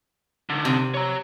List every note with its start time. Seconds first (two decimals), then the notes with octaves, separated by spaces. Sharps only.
0.50 D3 D#3
0.65 C3
0.94 C#5 A#5